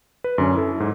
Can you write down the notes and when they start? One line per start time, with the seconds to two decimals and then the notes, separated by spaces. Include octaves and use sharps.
0.24 B4
0.38 F#2 D3 C#4
0.55 E4 A4
0.80 G#2